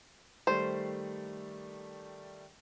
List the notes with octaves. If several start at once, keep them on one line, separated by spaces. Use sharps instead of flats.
D#3 G3 A3 C5